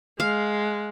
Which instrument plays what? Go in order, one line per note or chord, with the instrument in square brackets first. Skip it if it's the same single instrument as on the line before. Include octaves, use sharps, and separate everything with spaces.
[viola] G#3 [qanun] F5